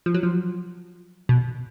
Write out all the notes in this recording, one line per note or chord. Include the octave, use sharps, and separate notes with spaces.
F3
F#3
F3
B2